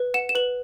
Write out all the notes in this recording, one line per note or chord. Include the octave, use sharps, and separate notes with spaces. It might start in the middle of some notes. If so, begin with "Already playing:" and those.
Already playing: B4
F#5 E7
E7
B4 F#7